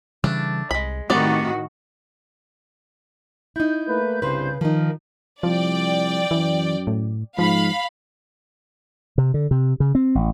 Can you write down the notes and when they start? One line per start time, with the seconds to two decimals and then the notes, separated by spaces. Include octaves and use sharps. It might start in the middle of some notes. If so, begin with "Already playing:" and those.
0.24 C#3 E3 G3 A3 D4
0.71 C2 G#3 B5
1.10 A2 D#3 A3 B3 C4 F#4 G4 D5
3.56 D#4 E4 G6
3.88 A3 A#3 B4
4.22 C2 G2 C#3 B4 C5
4.61 D#3 F3 D#4 A#4
5.43 C2 F3 D5 G5
6.31 F#2 E3
6.87 A2
7.39 G#2 F3 F5 B5
9.18 C3
9.34 D3
9.51 C3
9.80 C#3
9.95 C4
10.15 A1